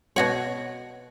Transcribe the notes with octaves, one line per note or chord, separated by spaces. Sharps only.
B2 F#4 C#5